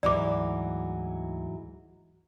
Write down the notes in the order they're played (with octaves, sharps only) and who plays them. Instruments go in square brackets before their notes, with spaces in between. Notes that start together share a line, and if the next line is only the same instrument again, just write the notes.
[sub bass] D2 [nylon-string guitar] G#2 E3 F#3 [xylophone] D5 D6